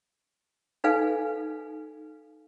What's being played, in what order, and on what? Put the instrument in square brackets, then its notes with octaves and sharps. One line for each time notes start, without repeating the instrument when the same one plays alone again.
[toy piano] D#4 A4 B4 F5 G#5